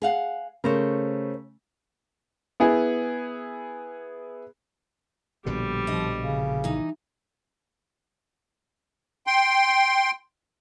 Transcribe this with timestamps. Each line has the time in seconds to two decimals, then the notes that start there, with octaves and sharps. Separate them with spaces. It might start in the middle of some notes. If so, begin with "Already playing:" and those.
0.02 G#4 F5 F#5
0.64 C#3 A3 A#4 C5 C#5
2.60 B3 E4 G#4
5.46 A#1 B2 D3 G3
5.87 F3 D4 D#5
6.20 C#3
6.64 E3 D#4
9.27 G5 C6